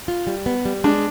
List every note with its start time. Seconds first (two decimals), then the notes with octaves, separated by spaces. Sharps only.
0.08 F4
0.27 G3
0.46 B3
0.65 G3
0.84 G#3 D4